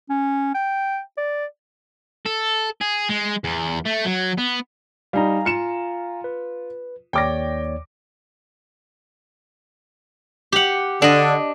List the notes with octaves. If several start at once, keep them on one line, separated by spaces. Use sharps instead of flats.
C#4
G5
D5
A4
G#4
G#3
E2
A3
F#3
B3
G3 D#4 F5 G#5 A#5
F4 C#7 E7
B4
D#2 C#5 D5 G5 D6 A#6
G4 F#5
D3 D4 D#5